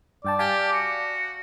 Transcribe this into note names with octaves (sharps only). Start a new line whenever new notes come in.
G2 D5 G5 A5
G4 F5 G#5 A5
F#4